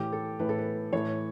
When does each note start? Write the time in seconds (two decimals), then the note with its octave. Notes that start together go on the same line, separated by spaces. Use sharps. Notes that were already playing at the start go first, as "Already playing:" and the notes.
Already playing: A2 E3 G4
0.12 A4
0.39 A2 E3 B4
0.49 A4
0.58 B4
0.92 A2 E3 C#5